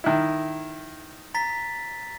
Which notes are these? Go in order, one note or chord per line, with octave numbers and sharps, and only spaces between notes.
D#3 E4
A#5 A6 B6